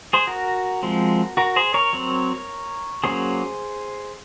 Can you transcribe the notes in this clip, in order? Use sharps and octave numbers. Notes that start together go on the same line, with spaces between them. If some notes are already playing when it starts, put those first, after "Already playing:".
G#4 C5
F#4 A#4
F3 G#3 C4
F#4 A#4
G#4 C5
A#4 C#5
F#3 C4
F#3 A#3 C#4 G#4 C5